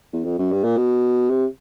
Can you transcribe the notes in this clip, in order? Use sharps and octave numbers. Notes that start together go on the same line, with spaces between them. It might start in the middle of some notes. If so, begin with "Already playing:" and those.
E2
F2
F#2
G2
A#2
B2
C3